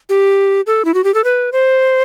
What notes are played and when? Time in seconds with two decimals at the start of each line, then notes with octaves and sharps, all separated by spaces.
0.09 G4
0.67 A4
0.85 E4
0.94 F#4
1.04 G4
1.14 A4
1.24 B4
1.52 C5